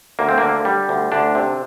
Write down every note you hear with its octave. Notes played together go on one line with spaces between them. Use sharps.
D2 A#3
C4
D3 A#3
G3
D2
D2 D4
C3